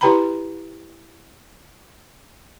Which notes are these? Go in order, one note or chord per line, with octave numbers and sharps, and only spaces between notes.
E4 G4 B4 G5 A#5 B5